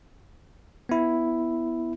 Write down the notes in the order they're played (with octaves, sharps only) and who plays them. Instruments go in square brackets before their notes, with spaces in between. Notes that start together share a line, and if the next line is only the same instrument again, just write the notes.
[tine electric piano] B3 E4